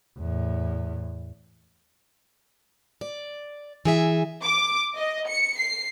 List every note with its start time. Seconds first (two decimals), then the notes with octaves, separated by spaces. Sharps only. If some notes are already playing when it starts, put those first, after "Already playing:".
0.19 E2 A2
3.01 D5
3.85 E3 G#4 E5
4.45 D6
4.97 D#5
5.28 C#7
5.58 C7